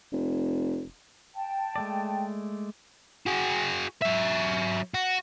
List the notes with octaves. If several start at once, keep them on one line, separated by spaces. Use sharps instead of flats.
F1
G5 A5
G#3 A3 D5
F#4 G#4
F#3 E5
F#4